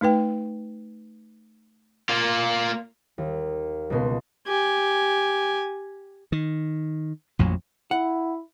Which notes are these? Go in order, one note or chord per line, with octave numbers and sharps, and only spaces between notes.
A3 D#4 B4 G5
A#3 F4
D#2
C#2 B2 C6
G4 G#5
D#3
A1 F2 A#2 F#3
E4 F#5